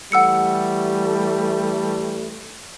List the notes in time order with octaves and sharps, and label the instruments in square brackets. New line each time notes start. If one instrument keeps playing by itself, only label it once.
[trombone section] E3 G3 A3 [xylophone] F#5 E6 C#7